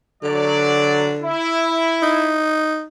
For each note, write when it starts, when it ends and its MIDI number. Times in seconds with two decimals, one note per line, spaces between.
0.23 1.33 50
0.23 1.15 54
0.23 1.15 74
1.23 2.37 64
2.02 2.85 63